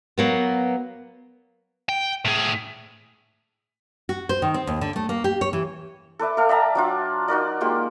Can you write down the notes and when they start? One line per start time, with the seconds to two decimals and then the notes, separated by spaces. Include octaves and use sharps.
0.18 F#3 A#3 B3
1.89 G5
2.25 A2 G#4
4.09 F#4
4.29 C5
4.42 D#3
4.54 C4
4.67 D#2
4.81 D3
4.96 A3
5.09 A#3
5.24 G4
5.41 C#5
5.53 E3
6.19 A4 B4 D5 E5
6.37 A4 F5 G5
6.49 D5 E5 A5 A#5
6.75 F#3 D4 F4
7.28 D#4 F#4 A#4 D5
7.61 G#3 A#3 F4 G4